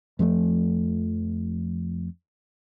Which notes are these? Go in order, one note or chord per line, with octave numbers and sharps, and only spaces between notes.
F2 F3 G#3 A3